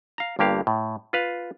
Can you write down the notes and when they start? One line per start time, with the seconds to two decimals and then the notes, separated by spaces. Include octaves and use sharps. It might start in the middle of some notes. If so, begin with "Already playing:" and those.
0.18 F5 A#5
0.39 G1 G2 A#3 G4 F5
0.67 A2
1.13 F4 B4 F5